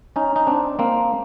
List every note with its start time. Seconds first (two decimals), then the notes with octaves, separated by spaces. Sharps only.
0.16 C#4 D#4
0.36 D#4
0.47 C4 D4
0.79 A#3 C4